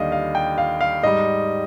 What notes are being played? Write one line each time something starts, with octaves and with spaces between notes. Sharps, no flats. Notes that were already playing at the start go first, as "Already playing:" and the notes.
Already playing: D#2 D3 G3 D#5 F5
F5
G5
F5
F5
G#2 G3 D#5